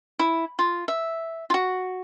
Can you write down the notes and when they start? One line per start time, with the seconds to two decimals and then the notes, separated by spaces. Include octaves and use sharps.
0.19 E4
0.59 F4
0.88 E5
1.50 F4 F#4